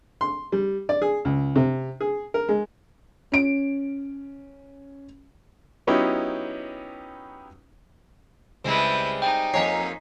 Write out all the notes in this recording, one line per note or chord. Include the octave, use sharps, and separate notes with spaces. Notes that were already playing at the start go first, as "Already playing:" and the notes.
C6
G3
D5
G#4
C#2
C3
G#4
A#4
G#3
C#4 D7
F#3 B3 C#4 D#4 E4 G4
C#2 G3 G#3 C4 E4 B4
D#4 G5
F2 A#3 C#5 D#5 G#5 A#5 B6 C7